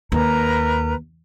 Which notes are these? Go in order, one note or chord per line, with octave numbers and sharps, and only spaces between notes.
D#2 A#4 B4 A#5